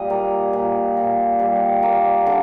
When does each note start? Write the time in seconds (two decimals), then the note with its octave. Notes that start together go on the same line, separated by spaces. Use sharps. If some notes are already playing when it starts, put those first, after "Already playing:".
Already playing: A#2 G3 D#5
0.10 A#3
0.53 A#2
0.97 A#2
1.39 G3
1.83 A#3
2.27 D3